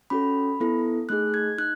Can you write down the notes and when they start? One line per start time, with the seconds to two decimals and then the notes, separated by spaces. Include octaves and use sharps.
0.10 C#4 F#4 A4 B5
0.60 B3 E4 A4
1.09 A3 D#4 G#4 F#6
1.34 G#6
1.58 D#4 F#6